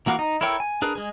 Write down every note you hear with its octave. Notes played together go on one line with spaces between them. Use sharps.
E3 A#3 F#4 F5 D6
D#4
E4 A4 A#4 C#5 G5
G#5
D4 G#4 A#4 B4
G#3 G#4